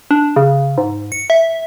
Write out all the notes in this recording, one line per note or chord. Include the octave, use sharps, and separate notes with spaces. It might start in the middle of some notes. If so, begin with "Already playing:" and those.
D4
C#3
G#2
C#7
E5